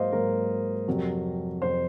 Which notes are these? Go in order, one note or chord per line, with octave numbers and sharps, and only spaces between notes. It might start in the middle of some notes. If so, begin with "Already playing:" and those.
Already playing: G#2 F#3 A#3 C5 D#5 F5
G#2 F#3 A#3 A#4
F2 C3 F#3
F2 C3 F#3 C5